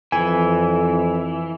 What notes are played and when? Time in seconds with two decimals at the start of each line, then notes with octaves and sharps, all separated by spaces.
0.12 F2 E3 G#5